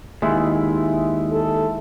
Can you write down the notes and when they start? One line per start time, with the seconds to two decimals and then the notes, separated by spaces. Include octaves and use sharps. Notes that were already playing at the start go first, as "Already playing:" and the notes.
0.22 D#2 G#3 E4
1.32 A4